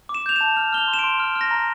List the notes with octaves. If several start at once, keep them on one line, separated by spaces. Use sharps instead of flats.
D6
E7
G6 F7
E7
A5
F6 F7
F6 G7
F7
C6
E7
D7
C6
F6
F6
A#6
A#5